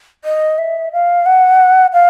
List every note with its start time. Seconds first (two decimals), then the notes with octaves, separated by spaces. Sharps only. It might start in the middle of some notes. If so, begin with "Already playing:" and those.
0.25 D#5
0.58 E5
0.93 F5
1.26 F#5
1.93 F5